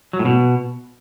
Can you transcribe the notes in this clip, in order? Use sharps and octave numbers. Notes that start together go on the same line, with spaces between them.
F#3
A2
B2